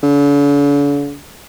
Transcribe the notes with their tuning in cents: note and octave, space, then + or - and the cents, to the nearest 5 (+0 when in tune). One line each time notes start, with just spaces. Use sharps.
D3 -45